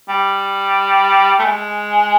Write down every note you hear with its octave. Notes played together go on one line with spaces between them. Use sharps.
G3
A3
G#3